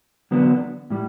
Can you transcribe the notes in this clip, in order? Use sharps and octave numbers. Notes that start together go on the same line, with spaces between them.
D3 F#3 B3 D4
A2 G3